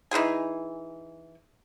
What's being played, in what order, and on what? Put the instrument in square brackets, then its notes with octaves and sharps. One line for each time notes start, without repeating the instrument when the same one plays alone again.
[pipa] E3 D#4 G#4 G#5